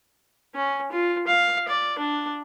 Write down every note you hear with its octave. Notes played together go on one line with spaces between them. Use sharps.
C#4
F4
F5
D5
D4